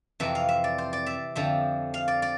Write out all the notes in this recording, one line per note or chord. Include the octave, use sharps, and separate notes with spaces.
F2 C3 E3 E5
F5
E5
D5
C5
D5
E5
F2 D3 F3 E5
F5
D5
D5